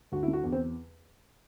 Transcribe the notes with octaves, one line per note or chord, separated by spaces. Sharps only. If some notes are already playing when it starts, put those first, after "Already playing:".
D2 F#4
E4
D3
F#4
E2
C4